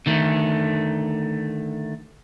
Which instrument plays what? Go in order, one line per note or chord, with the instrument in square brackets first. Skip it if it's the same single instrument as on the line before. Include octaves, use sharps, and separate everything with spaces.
[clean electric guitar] D3 D#3 A3